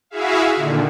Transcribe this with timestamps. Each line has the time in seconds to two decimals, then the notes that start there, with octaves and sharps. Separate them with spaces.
0.10 E4 F#4 G#4 E5 F5
0.54 A#2 D3 D#3